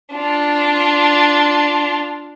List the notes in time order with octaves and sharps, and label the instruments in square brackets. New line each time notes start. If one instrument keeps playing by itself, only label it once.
[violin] D4 F4